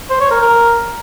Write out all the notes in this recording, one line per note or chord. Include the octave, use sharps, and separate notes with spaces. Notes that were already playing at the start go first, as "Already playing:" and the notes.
C5
C#5
A#4
A#4